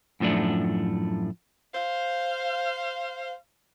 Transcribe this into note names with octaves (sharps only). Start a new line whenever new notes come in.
F#2 A2 F3 A3 D4
C5 F5